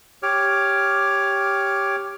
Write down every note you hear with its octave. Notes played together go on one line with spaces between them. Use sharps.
G4 C#5 D6 F6